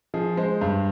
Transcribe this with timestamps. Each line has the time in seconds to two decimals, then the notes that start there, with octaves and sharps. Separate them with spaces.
0.14 F3 G#4
0.37 G#3 C5
0.61 G2